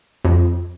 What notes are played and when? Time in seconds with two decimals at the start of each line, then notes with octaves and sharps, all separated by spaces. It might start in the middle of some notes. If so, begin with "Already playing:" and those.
0.24 F2